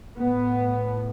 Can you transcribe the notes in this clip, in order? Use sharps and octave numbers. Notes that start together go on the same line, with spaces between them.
A2 B3